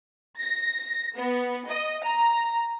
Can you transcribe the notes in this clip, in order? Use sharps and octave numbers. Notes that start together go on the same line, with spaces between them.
A#6
B3
D#5
A#5